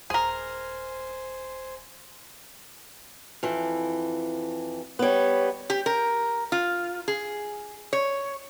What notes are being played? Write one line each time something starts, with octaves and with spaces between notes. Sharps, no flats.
D#1 G#4 A#4 C5 G#5
F2 E3
G3 B3 C#5
G4
A#4
F4
G#4
C#5